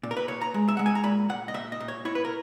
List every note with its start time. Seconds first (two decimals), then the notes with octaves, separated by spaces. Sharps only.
0.03 A#2
0.11 A#4
0.17 B4
0.28 A#2 C#5
0.42 A#5
0.54 G#3
0.68 E5
0.77 G#3 F#5
0.86 G#5
0.95 A#5
1.04 A#2 B5
1.29 A#2 F#5
1.48 D#5
1.54 A#2 E5
1.72 D#5
1.80 A#2
1.88 C#5
2.05 E4 C#5
2.15 B4
2.25 A#4